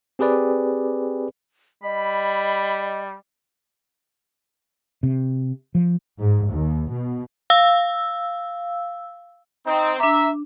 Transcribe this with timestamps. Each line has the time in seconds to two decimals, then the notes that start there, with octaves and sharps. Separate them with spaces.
0.19 C4 G4 G#4 B4 D5
1.83 G3 D#5 B5
5.03 C3
5.75 F3
6.20 G#2
6.50 D#2
6.93 B2
7.50 F5 E6
9.67 C4 D#4
10.00 D4 E5 A#5 D6